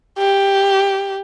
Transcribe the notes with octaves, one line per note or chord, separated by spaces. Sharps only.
G4